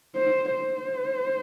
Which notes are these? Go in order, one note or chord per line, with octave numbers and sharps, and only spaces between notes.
C5
C5